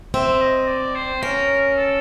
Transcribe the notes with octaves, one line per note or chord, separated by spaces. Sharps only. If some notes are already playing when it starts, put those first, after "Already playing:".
C4 E5
D#5
D5
C5
C#4 A#4
A4